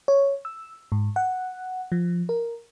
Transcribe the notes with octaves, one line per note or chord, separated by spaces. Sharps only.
C#5
E6
G#2
F#5
F3
A#4